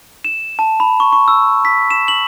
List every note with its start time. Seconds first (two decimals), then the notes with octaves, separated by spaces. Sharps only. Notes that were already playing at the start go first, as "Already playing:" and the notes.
0.25 E7
0.59 A5
0.80 B5
1.00 C#6
1.13 C#6
1.28 E6
1.65 B6
1.91 E7
2.08 F#7